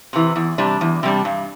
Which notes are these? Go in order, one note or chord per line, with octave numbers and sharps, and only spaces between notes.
C3 E3
E2
C3 G3 D4
E2
C3 G3 D4
G2